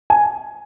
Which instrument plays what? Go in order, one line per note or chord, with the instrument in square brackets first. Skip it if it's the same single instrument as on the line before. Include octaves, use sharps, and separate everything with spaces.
[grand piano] G#5